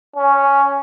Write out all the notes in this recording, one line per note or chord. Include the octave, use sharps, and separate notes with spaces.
C#4